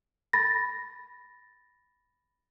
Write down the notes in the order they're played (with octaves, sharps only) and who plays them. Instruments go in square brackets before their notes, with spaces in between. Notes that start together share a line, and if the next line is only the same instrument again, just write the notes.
[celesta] B5 A6 A#6